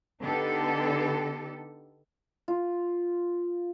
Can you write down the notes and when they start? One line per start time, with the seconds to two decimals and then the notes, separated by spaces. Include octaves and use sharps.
0.22 D3 B3 D#4 G4 A4
2.48 F4